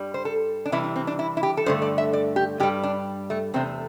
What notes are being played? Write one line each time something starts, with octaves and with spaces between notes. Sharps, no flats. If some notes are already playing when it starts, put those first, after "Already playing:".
Already playing: G2 G3
C5
A4
D4
C3 E3 G3 E4
D4
C4
D4
E4
E4
G4
A4
G2 D3 A3 C5
D5
E5
D5
G4
G2 G3 G4
D4
A3
E2 C3 A3 C4